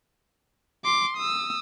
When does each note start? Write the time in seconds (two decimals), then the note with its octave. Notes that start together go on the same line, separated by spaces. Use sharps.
0.84 C6 D6
1.17 D#6 E6